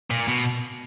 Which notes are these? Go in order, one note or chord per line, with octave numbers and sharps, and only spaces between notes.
A#2
B2